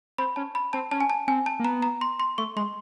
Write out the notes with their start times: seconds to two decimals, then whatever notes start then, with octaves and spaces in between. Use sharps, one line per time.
0.18 C4 B5
0.36 C#4 A5
0.55 B5
0.73 C4 A5
0.91 C#4 A5
1.00 G#5
1.10 A5
1.28 C4 G#5
1.46 A5
1.60 A#3
1.65 B3 A#5
1.82 A#5
2.01 C6
2.20 C6
2.38 A3 C#6
2.56 G#3 C6